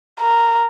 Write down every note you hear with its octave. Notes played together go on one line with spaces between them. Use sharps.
A#4